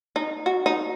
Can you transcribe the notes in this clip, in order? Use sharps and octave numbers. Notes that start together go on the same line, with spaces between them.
D#4
F#4
D#4